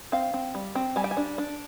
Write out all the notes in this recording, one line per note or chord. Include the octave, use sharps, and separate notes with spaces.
C4 F5
C4
G3
C4
G3 G#5
G5
G#5
D4
D4